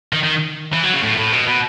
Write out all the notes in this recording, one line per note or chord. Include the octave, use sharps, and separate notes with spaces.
D#3
D#3
E3
F#3
C#3
A2
A2
B2
B2